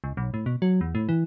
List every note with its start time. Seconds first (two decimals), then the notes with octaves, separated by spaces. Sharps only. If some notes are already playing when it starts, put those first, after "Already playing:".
0.04 C#2
0.17 B1
0.34 A2
0.46 B2
0.62 F#3
0.81 E2
0.95 A2
1.09 E3